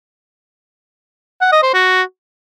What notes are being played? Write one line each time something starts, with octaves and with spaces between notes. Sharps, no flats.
F#5
D#5
C5
F#4